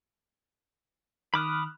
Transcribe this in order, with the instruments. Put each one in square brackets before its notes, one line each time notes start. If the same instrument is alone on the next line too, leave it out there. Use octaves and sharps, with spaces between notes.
[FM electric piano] D#3 F6 F#6 [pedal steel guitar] B5 D6 D#6